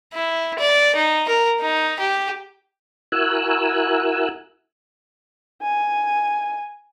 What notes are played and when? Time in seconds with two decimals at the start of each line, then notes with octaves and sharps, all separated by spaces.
0.14 E4
0.59 D5
0.96 D#4
1.29 A#4
1.61 D#4
2.00 G4
3.12 E4 F#4 A#4 G#5 E6 F#6
5.62 G#5